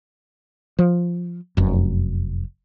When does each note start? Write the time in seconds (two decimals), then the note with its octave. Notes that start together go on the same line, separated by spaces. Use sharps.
0.79 F3
1.57 F1 F#2